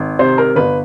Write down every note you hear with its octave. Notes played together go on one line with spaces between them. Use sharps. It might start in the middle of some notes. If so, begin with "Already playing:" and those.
Already playing: G#1
C3 C5
A#4
G1 B4